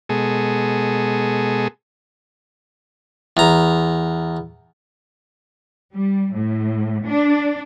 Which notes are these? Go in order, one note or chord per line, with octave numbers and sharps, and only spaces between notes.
B2 G#3 G#4 A4
E2 A#5
G3
A2
D4